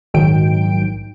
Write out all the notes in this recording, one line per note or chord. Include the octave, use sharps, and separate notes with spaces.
A#1 G#2 D#3 F#3 G5 D7